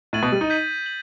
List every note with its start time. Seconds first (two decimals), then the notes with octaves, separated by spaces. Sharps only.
0.13 A2 A6 D#7 F#7
0.23 B2
0.32 G3
0.41 D#4
0.50 G6 B6 D#7 F#7
0.86 F#7